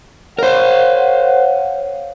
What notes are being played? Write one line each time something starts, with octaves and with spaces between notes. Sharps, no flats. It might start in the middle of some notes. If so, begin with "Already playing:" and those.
A#4 C5 C#5 F5 F#5